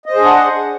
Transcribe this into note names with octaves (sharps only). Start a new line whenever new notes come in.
D4 G#4 C5 D#5 F#5